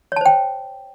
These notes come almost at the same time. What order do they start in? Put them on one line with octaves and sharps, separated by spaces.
C#5 A5 C5 G5